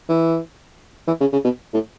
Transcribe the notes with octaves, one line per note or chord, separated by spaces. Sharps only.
E3
E3
C#3
C#3
B2
A2